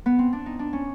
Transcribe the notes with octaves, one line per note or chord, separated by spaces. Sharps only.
B3
C4
D4
D#4
D4
C#4